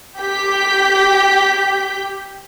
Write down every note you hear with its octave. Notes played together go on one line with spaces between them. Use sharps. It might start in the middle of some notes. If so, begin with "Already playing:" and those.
G4 G6 B6